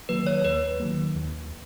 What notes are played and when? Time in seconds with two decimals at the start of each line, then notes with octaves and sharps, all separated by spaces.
0.09 D#3 F#3 A#3 B4
0.27 C#5
0.45 D#2 B4
0.80 D#3 F#3 A#3
1.15 D#2